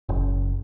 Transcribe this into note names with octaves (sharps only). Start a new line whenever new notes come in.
F#1